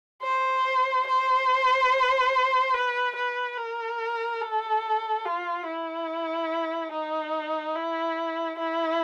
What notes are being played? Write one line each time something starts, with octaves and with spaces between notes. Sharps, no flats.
C5
C5
B4
B4
A#4
A4
F4
E4
D#4
E4
E4